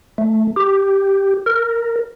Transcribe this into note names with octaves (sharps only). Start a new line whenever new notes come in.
A3
G4
A#4